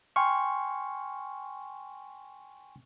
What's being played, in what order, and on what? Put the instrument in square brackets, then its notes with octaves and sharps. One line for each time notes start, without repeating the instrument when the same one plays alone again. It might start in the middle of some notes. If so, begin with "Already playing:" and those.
[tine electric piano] G5 G#5 C6 C#6 F6